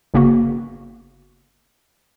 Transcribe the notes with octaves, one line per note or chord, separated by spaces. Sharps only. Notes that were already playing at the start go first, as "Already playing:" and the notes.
G1 C#3 A#3 B3 F#4